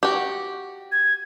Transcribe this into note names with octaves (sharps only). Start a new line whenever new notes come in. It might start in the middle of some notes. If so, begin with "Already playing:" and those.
F#4 G4
G#6